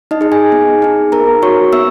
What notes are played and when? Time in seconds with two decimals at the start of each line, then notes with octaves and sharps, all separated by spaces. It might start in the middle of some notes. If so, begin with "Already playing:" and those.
0.11 D#4 D#5
0.21 D#4 G#4
0.32 G#4 G#5
0.52 B3
0.82 D#4 G#4
1.12 B3 A#4 A#5
1.42 F#4 C#5 C#6
1.73 B3 E5 E6